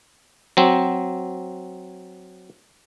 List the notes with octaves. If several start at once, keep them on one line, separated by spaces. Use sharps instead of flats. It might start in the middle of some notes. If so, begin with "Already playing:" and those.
F#3 C4